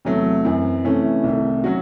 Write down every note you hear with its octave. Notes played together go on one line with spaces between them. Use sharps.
E2 C3 F#3 A3
F#2 E3 C4
C3 E3 A3 C#4 E4
C2 C3 D#3 A3
F#3 C#4 F#4